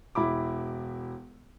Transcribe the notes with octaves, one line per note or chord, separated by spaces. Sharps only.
E1 E4 B5 D6